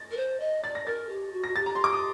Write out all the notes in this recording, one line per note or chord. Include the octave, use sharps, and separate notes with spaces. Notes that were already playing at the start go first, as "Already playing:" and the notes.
Already playing: A6 A#6
A#4
C5
D#5
D5 A6
A#6
A#4 A6
G4
F#4
F#4 A#6
G4 A6
A#5
C6
D6
D#6